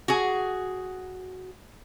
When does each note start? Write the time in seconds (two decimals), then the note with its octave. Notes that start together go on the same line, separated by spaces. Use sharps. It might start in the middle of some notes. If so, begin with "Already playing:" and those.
0.08 F#4 G#4